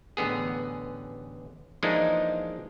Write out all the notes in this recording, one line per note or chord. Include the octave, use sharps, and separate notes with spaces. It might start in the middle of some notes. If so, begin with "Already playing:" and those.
A1 D3 B3 G#4
E3 F3 G#3 A#3 D4 D#4